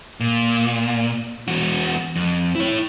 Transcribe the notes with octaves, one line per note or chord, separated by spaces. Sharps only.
A#2
E2 F#4
F2
E4 C#5